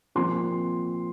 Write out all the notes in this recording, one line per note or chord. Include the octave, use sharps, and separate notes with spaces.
A#2 F3 C4 C6